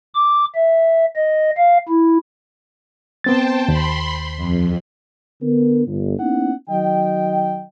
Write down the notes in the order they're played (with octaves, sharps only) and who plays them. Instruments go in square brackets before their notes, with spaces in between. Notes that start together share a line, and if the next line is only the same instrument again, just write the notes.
[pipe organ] D6
E5
D#5
F5
E4
[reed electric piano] B3 C4 A6 [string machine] C5 G5 A5
[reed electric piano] D#2 [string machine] B5 C6
[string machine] F2
[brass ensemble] D3 B3 A#4
G1
A#3 B3 C#4 D#4 E4 F#5
D#3 F#3 D#5 G5